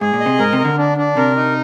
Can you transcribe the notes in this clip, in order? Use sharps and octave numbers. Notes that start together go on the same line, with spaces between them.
G#2 G#4
A#2
D#5
C3
G#2 A#4
C3
A#4
D3
D4
D4
C3 A#4
D#4